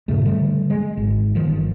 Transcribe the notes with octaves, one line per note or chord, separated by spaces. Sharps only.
G2 A#2 C#3 A3
D3 G3 A3
G#3
G#1
G1 D#3 F3